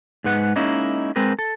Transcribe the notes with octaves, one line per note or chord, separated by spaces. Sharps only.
G#2 G#3 B4 F#5
G#3 A#3 C#4 D#4 E4
G#3 C4 A#4 B4
A4